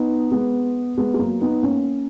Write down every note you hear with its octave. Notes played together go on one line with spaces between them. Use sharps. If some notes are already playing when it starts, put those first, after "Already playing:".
Already playing: B3 D#4
G#3 B3
G#3 B3
G#3
F#3 A#3
B3 D#4
A#3 C#4